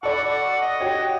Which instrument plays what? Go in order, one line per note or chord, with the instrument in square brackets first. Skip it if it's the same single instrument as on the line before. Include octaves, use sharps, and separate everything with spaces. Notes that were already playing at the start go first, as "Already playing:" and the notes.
[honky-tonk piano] A4 D5 B5 [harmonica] F#5 C#6
[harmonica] D#5
[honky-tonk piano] F#4 G4 C#5